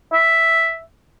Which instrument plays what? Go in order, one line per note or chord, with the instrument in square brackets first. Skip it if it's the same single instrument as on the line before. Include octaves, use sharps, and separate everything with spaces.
[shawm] E5